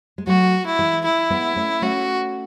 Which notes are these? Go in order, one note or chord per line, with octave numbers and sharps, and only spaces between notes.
G#3
F#3 A3 F#4
E4
E3 G#3
E4
G#3 B3
A3 C#4
A3 C#4 F#4